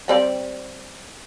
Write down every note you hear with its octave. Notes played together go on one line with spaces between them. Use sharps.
G3 C4 D5